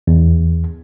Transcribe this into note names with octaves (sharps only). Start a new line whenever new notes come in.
E2